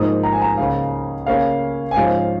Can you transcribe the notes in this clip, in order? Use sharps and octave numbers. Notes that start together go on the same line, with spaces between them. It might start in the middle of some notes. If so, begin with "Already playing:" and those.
Already playing: G#2 F3 A#3 D#4 D#6
A#5
G#5
A#5
C#2 C#3 A#3 C#4 F5
C#3 A#3 C#4 F5
G#5
G#2 F3 C#4 F5